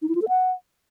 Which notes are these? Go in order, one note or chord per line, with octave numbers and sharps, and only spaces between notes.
D#4
E4
F4
A4
F#5